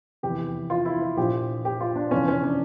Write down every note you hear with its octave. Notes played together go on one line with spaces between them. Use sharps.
F1 E2 E3 G4
F4
E4
F4
A#1 A#2 F3 G4
G4
F4
D4
F1 F2 E3 C#4
C#4
D4